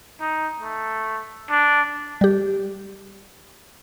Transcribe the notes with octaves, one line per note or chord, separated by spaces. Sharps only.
D#4
A3
D4
G3 G4